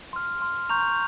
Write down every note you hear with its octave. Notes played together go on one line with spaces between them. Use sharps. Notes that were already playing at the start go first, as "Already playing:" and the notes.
C6 F6
C6 F6
A#5 C#6 G6 F7